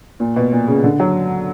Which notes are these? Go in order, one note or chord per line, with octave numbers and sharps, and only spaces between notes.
A#2
B2
A#2
C#3
D3
F#3